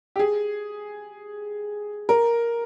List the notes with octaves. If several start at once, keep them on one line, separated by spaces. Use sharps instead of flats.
G4
G#4
A#4